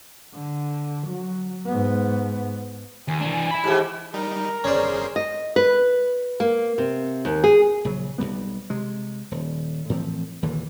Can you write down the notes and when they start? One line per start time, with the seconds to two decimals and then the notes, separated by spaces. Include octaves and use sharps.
0.34 D3
1.07 F#3
1.66 G#2 B3
3.08 D#2 G#5
3.21 E3 D4
3.51 E5 B5
3.64 G#2 E3 G4
4.14 G3 D#4 A#4
4.64 G1 C#4 G#4 C5 D5
5.16 D#5
5.56 B4
6.40 A#3
6.78 C3
7.25 D#2
7.44 G#4
7.85 A#1 C#3 F#3
8.18 B1 G2 G3 B3
8.70 C3 G#3
9.31 D#1
9.89 A2 E3 F3 C4
10.42 D#2 A#2 D3 E3